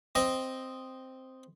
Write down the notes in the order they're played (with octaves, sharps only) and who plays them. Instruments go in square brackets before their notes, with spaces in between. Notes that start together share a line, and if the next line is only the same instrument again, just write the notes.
[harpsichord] C4 D#5